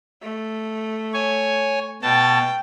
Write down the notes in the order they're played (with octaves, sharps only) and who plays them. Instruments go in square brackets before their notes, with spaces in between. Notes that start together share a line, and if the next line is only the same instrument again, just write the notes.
[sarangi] A3
[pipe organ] C#5 G#5
[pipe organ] B2 A5 [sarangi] G5